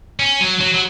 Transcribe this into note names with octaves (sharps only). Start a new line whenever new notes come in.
C#4
F#3
F#3
F#3